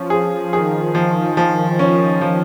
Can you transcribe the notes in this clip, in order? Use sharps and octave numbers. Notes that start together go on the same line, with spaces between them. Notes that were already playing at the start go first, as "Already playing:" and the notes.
Already playing: F3 C#4
G#4
D#3 G#4
F3
F3
C#4
F3